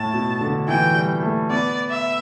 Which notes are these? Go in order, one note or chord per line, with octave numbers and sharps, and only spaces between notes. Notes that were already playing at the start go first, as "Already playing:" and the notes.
Already playing: A2 A5
B2
D3
E3 G5
G3
A3
B3 D5
E5